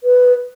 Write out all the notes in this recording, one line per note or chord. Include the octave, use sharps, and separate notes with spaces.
B4